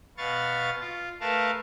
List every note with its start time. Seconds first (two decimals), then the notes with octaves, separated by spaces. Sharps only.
0.18 B2 B4 F5 C#6 A6
0.80 F4
1.20 A3 A#4 B4 F5 A5